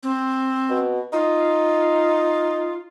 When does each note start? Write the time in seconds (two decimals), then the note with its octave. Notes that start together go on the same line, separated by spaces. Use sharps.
0.03 C4
0.70 B2
1.13 D#4 F4